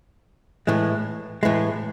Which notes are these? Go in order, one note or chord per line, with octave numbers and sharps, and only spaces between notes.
A2 E3 G#3
A2 E3 G#3